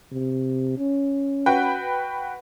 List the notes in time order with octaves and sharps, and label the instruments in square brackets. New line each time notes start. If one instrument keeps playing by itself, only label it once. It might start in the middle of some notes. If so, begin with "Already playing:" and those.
[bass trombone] C3
C#4
[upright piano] F#4 B4 G5